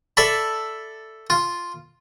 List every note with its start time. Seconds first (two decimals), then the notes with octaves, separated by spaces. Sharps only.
0.17 A4 D5 E5 A5 B5
1.30 F4